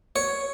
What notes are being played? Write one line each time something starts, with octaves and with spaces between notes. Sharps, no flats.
C#5